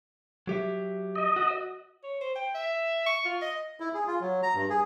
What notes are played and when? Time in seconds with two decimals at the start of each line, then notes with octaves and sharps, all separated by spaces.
0.47 F#3 G4 E5
1.15 D#5
1.36 F#4
2.04 C#5
2.21 C5
2.35 G5
2.55 E5
3.06 C#6
3.25 F4
3.42 D#5
3.80 E4
3.94 G#4
4.07 F4
4.21 F#3
4.43 A#5
4.54 G2
4.70 G#4